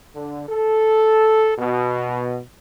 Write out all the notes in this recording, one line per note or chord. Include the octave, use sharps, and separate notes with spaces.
D3
A4
B2